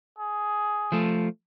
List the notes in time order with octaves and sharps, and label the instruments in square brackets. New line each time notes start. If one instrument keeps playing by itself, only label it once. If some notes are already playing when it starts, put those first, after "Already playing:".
[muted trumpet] G#4
[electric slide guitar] F3 A3